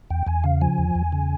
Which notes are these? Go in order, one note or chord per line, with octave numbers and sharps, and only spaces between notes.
E2 G5
E2 G#5
C#3 F5
F3 G#5
E2
E2
C#3